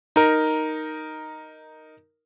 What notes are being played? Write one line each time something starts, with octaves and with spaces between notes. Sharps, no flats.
D#4 A#4